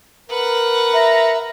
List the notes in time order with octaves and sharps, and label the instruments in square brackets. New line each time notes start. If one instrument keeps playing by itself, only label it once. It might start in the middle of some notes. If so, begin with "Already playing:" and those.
[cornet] A#4 [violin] B4 F#5
[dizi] E5 [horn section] A#5